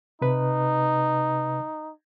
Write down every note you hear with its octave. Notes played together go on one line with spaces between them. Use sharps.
C3 D#4 B4